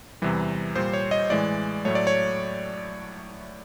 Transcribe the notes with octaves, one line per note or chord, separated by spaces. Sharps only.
E2 C3 E3 G3
A#2 G3 C5
C#5
D#5
A2 E3 G#3 D5
A2 F#3 A3 C#5
D5
C#5